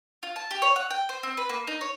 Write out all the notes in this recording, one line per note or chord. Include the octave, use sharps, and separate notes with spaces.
F4
A5
G4
C#5
F#5
G5
C5
C4
B4
A#3
D#4
C#5